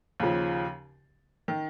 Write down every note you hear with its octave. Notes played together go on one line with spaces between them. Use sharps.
D#2 C#3 F3
D#3